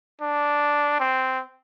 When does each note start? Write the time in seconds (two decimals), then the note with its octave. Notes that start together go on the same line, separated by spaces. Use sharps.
0.21 D4
1.00 C4